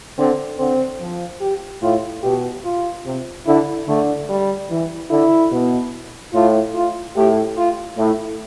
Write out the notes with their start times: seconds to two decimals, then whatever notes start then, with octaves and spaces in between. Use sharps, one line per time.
0.18 D3 C4
0.59 D3 C4
1.00 F3
1.41 G4
1.82 A2 F4
2.23 B2 G4
2.65 F4
3.05 C3
3.46 D3 E4
3.87 D3 A3
4.29 G3
4.70 E3
5.10 D3 E4
5.52 B2
6.34 A2 F4
6.75 F4
7.16 A2 G4
7.57 F4
7.97 A2 E4